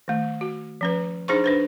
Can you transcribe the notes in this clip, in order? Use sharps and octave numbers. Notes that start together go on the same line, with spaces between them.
D#3 A3
F#4
F3 C#4 B4
D4 D#4 G#4 C5 A#5 C#6
D4 B4 C5